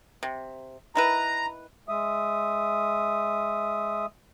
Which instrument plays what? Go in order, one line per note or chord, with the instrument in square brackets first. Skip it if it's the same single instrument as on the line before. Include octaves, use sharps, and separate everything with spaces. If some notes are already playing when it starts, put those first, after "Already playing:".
[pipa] C3
[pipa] D#3 E4 B4 [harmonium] A#5
[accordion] G#3 E5 D#6